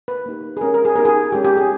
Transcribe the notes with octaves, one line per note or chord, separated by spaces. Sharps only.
B4
A#3 D#4 G4
G#4
G#3 C#4 G4 A#4
A#4
G#4
B3 D#4 G4 A#4
G#4
G#3 C#4 G4
G4
G#4